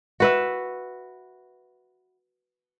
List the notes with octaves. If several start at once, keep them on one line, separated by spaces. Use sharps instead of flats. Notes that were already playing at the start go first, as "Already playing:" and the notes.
F#4 B4 E5